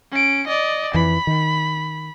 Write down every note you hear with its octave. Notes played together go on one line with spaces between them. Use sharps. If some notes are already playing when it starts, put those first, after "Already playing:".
C#4 D7
D5 D#5
F2 E3 B5
D#3